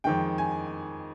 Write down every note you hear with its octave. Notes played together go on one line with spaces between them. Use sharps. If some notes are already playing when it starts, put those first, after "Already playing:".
F2 D#3 G#3 G5
G#5